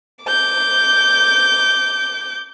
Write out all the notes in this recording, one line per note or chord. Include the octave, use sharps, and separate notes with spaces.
D6 G6